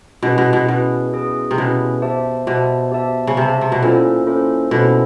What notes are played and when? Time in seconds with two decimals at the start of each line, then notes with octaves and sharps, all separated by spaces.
0.23 B2 C#4 E4 G#4 B4
0.38 B2
0.53 B2
0.68 B2 C#4 E4 G#4 B4
1.13 C#4 E4 G#4 B4
1.51 C3
1.57 B2 C#4 E4 G#4 B4
2.02 G4 C5 E5 A5
2.47 B2 G4 C5 E5 A5
2.92 G4 C5 E5 A5
3.27 C#3
3.37 C3 G4 C5 E5 A5
3.61 C3
3.72 B2
3.82 A#2 C#4 E4 A4 C5
4.27 C#4 E4 A4 C5
4.71 B2 C#4 E4 A4 C5